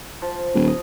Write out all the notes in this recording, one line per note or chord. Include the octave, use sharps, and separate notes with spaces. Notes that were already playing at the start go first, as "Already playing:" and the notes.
F3
D#1
D#5